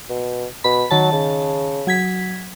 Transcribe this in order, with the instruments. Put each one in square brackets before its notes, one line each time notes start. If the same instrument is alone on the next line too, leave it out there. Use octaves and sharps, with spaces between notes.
[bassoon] B2
[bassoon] B2 [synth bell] B5
[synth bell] D#3 A5 [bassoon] F#3
[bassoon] C#3
[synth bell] F#3 G#6 B6